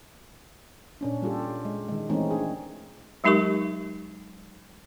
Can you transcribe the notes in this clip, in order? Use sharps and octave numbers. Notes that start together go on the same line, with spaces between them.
A#2 C#4 D4
G3 F4 G4 A4
G#3
D#3 G#3
E3 G#3 A3 C4 C#4 D#4
D4 G#4
F#3 G#3 D#4 G4 A#4 C#6